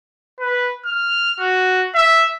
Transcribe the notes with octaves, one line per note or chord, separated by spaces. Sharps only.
B4
F6
F#4
E5